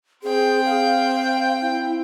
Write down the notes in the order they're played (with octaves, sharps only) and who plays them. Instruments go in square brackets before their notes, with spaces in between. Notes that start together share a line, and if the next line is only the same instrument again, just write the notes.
[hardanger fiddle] C4 G5 [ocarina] G#4
[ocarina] F5
E4